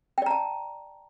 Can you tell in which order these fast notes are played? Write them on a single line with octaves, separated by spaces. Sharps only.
G5 D5 A#5 A5